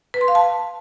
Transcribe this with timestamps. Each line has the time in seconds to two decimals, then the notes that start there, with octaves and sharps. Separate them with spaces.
0.14 B4
0.21 C6
0.28 F5
0.35 A5